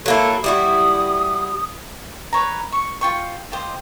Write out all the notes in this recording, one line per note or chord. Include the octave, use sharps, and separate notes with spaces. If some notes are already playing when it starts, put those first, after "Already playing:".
F#3 A#3 E4 A4
G3 E4 F#4 D#6
B4 C#5 A#5
C#6
F4 G5 C#6
F4 G4 C5 D#5